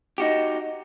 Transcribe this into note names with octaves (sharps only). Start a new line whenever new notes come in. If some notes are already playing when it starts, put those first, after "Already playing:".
D#4 F#4 G4